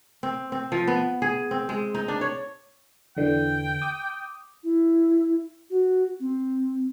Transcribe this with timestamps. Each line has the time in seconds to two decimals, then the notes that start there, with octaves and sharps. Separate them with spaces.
0.23 C4
0.52 C4
0.72 F3
0.87 B3
1.22 G#4
1.51 C4
1.69 G#3
1.94 D#4
2.08 D4
2.21 C#5
3.17 E2 D3 E3 G5
3.82 D6 D#6
4.64 E4
5.70 F#4
6.20 C4